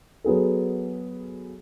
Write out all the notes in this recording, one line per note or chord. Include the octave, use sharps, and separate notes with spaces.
F#3 B3 G#4 A4